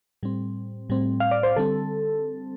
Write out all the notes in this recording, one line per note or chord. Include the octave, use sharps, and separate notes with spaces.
A2 G3 C4
A2 G3 C4
F5
D5
C5
D3 G3 C4 A4